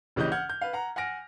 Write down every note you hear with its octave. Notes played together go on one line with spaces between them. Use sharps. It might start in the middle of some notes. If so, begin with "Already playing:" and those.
A#1 C#3 E3 G4 D#5 G6
F#5 F6 G6 G#6
G6
B4 F5
F#5 A#5
F#5 G#5 F6 A#6 D7